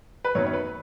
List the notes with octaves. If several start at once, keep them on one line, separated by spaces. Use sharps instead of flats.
B4
F#2 D#3 F#3 B3 C#5
C#5
B4